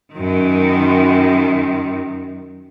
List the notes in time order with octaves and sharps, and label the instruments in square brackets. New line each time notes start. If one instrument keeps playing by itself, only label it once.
[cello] F#2 D#3